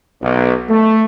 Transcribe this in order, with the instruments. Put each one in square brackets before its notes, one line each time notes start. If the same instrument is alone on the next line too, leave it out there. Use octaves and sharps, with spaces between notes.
[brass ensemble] B1
A3